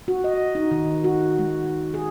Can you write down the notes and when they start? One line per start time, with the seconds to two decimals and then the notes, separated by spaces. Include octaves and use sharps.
0.08 F#4
0.24 D#5
0.55 D#4
0.71 D#3
1.04 F#4
1.38 G#3
1.94 G#4